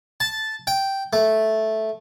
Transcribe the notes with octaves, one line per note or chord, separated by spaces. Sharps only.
A5
G5
A3